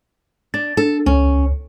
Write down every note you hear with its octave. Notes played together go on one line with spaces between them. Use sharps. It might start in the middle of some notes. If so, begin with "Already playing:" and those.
D4 A6
D4 A4
C#2 C#4